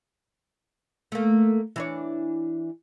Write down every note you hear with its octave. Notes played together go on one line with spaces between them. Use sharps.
A3 A#3
E3 D4 C#5